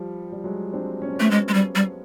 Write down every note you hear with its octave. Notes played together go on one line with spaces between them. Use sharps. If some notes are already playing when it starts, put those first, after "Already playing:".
Already playing: F3 G3
G3
F#3 G#3
C4 D4
C#4
C4
A3 B3 C#4
G#3
G#3
G3
G3